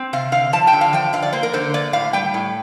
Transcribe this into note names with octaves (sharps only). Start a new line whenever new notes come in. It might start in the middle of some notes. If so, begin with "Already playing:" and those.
Already playing: C4
C3 F5
D3 F5
F3 A5
G5
D3
F5
F3 G5
D3 F5
D5
A#3 C5
A#4
D3 C5
A#3 D5
A2 F5
G3 G5
A2